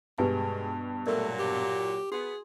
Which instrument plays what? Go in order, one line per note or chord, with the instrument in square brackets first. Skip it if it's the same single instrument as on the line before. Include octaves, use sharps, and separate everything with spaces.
[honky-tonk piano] G2 B2 [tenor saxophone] G#3 [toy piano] G4 B4 G#5
[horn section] A#2 F#3 [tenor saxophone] A3 [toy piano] A#4 D5
[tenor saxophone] G4
[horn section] B3 [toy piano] F#4 [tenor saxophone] G#4